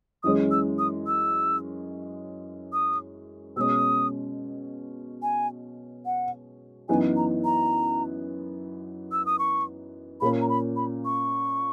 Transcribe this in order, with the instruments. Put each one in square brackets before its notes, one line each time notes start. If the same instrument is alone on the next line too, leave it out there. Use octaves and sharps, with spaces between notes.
[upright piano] F#2 E3 G#3 C#4 [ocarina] D#6
[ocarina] E6
D#6
E6
D#6
[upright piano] B2 G#3 C#4 [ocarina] D#6 E6
[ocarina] G#5
F#5
[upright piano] F#2 E3 B3 D#4 [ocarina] G#5
[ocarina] A#5
A#5
E6
D#6
C#6
[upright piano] A#2 A#3 C#4 [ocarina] B5
[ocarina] A#5
B5
B5
C#6